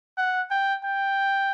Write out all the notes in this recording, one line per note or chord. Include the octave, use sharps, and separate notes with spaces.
F#5
G5
G5